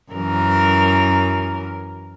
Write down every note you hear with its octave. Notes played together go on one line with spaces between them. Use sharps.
F#2 E3 A#4